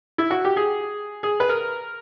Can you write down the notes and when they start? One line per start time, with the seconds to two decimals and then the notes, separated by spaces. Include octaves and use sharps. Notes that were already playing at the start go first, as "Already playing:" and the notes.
0.18 E4
0.30 F#4
0.45 G4
0.56 G#4
1.23 G#4
1.40 B4
1.49 A#4